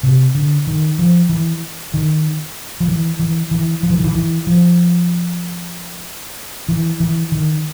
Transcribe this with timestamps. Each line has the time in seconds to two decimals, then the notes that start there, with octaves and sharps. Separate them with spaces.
0.03 C3
0.35 D3
0.67 D#3
0.99 F3
1.29 E3
1.94 D#3
2.80 F3
2.88 E3
3.19 E3
3.51 E3
3.83 F3
3.90 E3
3.98 D#3
4.04 E3
4.15 E3
4.47 F3
6.69 E3
7.00 E3
7.32 D#3